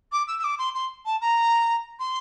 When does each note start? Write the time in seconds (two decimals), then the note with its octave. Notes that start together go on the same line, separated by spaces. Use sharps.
0.12 D6
0.27 E6
0.39 E6
0.44 D6
0.58 C6
0.74 C6
1.05 A5
1.21 A#5
1.99 C6